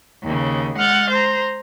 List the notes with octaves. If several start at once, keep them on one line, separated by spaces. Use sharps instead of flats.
D#2 C#3
G#3 F#5 F6 G6 A6
C5 A#5